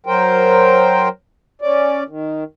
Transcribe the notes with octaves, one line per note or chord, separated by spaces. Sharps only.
F#3 A#4 C5 G5
C#4 D5
D#3